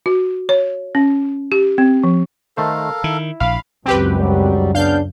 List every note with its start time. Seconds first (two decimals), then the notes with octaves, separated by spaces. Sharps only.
0.06 F#4
0.49 C#5
0.95 C#4
1.52 G4
1.78 C4
2.04 F3
2.57 D#3 A3 A4 A#4 C5 F5
3.04 D#3 E4
3.40 A#1 F5 B5
3.86 C#2 F#2 C4 G4 B4
4.18 G#2 F#3 G3
4.75 C#3 B3 D4 F5 G6